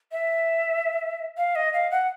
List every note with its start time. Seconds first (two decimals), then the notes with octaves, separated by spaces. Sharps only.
0.12 E5
1.37 F5
1.55 D#5
1.74 F5
1.91 F#5